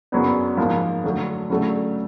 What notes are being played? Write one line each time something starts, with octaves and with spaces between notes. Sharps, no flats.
F#2 C#3 F#3 B3 D4
G#2 F3 A#3
D3 F#3 A3
C#3 F#3 A3 D4